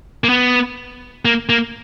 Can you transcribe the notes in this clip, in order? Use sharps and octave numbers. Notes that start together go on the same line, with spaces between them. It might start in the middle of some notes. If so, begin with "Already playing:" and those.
A#3
B3
A#3
A#3